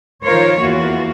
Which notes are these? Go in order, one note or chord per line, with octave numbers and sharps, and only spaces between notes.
D#3 F3 F4 A#4 C5 C#5
E2 E3 A#3 F4 F#4